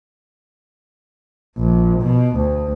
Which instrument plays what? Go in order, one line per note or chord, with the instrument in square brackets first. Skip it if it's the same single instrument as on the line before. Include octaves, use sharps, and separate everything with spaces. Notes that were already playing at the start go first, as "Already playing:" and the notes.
[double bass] A#1
B2
D2